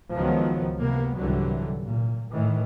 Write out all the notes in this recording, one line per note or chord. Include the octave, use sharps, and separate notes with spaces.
C#2 D#3 F3 F#3 B3
C3 A#3 B3
C2 G#2 D3 E3 F#3 G3
A#2
A2 D#3 E3